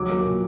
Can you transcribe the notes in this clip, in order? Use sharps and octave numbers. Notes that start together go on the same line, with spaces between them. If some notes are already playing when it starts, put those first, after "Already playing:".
Already playing: D#2 F#3 D6
A#3
A#2